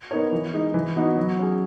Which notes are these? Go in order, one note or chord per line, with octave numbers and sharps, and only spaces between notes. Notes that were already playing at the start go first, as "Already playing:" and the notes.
B3 D#4 A#4 C#5
E3
G#3 D#4
E3
B3 D#4 F#4
F#3
C#4 G#4